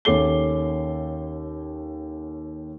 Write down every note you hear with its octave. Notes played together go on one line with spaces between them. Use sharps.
D#2 C#4 A4 D6 C7 G7